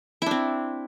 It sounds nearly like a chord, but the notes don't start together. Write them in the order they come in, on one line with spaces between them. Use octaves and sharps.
E4 D4 C4